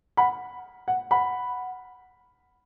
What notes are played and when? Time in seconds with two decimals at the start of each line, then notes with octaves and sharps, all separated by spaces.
0.17 F#5 B5
0.88 F#5
1.11 F#5 B5